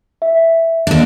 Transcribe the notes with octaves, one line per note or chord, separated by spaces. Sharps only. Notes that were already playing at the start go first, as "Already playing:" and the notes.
E5
D#2 D4